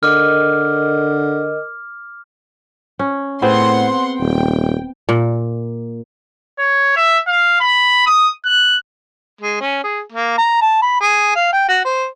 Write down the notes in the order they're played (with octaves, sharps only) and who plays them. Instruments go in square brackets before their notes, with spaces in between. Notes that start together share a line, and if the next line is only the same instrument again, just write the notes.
[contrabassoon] D3 [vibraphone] A#4 D#5 [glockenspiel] D6 F6
[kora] C#4
[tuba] A2 [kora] B3 C4 G#4 [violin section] F#5 C6
[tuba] D#1 [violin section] G5
[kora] A#2
[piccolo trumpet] C#5
E5
F5
B5
D#6
F#6
[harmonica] G#3
C#4
G#4
A#3
A#5
A5
B5
G#4
F5
G5
F#4
C5